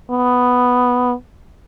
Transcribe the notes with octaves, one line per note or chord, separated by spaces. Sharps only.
B3